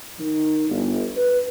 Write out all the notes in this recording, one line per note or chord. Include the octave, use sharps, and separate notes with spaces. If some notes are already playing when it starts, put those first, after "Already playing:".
D#3
G1
B4